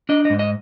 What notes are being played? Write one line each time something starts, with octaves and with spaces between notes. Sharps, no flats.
D4 D#5
D#5
G#2
D#5